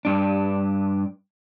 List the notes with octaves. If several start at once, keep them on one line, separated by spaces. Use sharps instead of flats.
G2 D4